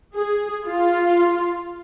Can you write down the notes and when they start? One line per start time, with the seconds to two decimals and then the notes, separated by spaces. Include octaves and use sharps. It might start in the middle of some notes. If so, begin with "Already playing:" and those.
0.15 G#4
0.66 F4